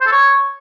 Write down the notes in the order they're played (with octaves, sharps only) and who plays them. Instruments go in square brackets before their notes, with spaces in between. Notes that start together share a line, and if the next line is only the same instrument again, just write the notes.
[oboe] C5
A4
C#5